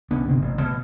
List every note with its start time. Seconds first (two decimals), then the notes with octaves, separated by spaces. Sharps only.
0.11 C2 B3 C#4 D4
0.27 G1 C3 B3 C4
0.42 A1
0.61 B2